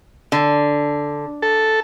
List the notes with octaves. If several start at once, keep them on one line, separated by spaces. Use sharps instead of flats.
D3
A4